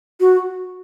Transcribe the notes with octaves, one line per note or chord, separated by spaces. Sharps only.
F#4